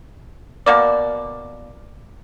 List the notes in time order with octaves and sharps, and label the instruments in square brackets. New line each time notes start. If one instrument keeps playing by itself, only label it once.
[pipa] B2 A#3 D5